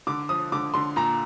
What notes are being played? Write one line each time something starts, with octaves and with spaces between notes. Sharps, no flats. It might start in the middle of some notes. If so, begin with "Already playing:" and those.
D3 D6
F3 D#6
D3 D6
D3 C6
A#2 A#5